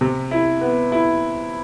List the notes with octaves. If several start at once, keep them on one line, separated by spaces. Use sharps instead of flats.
C3
E4
B3
E4